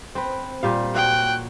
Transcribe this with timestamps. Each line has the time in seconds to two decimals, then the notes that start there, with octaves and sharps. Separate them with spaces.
0.15 C4 B4
0.63 A#2 G3 F5
0.95 F#4 C#5 G5 F#6